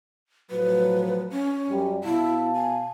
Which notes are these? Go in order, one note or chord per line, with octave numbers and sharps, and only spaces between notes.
A2 F3 F#3 B4
C#4
F#2 G3
B2 E4 F5 A5
G#5